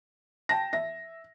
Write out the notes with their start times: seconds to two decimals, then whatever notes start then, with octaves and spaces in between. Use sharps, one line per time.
0.49 G5 A5 A#6
0.73 E5 A#6